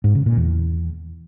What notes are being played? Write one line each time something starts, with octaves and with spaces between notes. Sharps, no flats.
G#2
C#3
A#2
E2